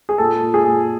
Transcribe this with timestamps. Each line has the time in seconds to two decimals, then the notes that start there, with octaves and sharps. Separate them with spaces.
0.09 G#4
0.18 A#2 A4
0.42 A#2
0.54 G#4
0.66 A#2